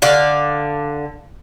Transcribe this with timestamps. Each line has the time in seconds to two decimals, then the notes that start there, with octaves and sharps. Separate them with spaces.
0.02 D3 D5 F5